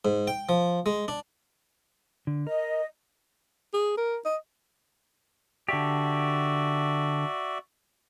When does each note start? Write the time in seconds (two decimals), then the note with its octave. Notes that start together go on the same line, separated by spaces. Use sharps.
0.05 G#2
0.27 G5
0.49 F3
0.86 G#3
1.08 D4
2.27 D3
2.47 A#4 D#5
3.73 G#4
3.97 A#4
4.25 D#5
5.69 D3 F#4 G4 D5 E5